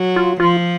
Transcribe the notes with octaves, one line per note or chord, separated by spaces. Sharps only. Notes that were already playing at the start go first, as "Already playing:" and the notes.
Already playing: F#3
F4
F3 F4